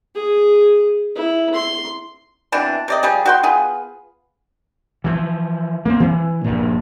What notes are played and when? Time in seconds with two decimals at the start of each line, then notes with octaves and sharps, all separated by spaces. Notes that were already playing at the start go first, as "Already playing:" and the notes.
0.15 G#4
1.15 E4
1.54 C6
2.52 B2 E3 C4 D4
2.88 C3 D5 D#5
3.03 F3 G3 G#4
3.26 F#4 G5 C6
3.43 B3 F4 G#4
5.04 E3 F3
5.86 A#3 C4
6.00 E3
6.44 A#1 G2 A#2